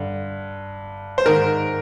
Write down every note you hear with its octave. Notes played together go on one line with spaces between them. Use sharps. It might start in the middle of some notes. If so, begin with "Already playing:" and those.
Already playing: G2 D3
C5
G#2 D#3 A#4